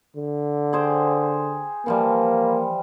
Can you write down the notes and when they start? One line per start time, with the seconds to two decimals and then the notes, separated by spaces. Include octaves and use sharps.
0.16 D3
0.73 G#4 C5 G5
1.86 E3 F3 G3 A#3